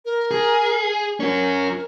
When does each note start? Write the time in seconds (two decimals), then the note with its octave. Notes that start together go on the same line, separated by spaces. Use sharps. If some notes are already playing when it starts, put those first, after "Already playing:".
0.05 A#4
0.31 G#4
1.20 C#4 F#4 A#4